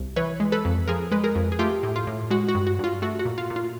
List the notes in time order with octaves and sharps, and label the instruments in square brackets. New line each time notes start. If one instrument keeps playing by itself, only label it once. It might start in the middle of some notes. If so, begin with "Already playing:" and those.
Already playing: [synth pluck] C2
E3 B4 C#5
G#3
A4 B4
F2
F3 G#4 A#4
G#3 B4
G#4 A#4
F2
G#4
A3 F4 G4
A2
F4
A2
G#3 F#4
F#4
G2
F#4
G2 F4
A3 F#4
F#4
A#2
F4
A#2
F4